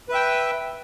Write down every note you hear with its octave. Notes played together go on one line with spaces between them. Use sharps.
B4 E5 G5